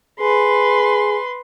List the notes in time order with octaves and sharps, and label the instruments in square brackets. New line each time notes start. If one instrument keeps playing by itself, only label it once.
[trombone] G#4 [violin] B4 C6